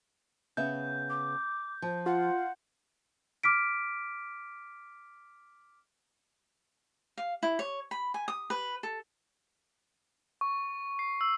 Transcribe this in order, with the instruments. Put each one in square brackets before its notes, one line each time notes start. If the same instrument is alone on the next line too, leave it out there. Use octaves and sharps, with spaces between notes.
[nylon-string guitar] C#3 B3 E5 [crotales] G6
[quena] D6
[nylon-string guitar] F3
[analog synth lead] F4 [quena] F#5
[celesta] D6 F6 B6 D7
[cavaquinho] F5
E4
C#5
B5
G#5
D#6
B4
A4
[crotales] C#6
C7
E6